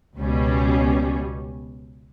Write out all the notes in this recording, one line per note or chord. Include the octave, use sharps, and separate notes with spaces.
C#2 B2 G3 C#4